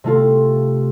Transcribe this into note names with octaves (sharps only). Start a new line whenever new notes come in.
C3 A3 F4